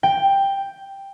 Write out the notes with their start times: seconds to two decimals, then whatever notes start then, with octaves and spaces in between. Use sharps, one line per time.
0.03 G5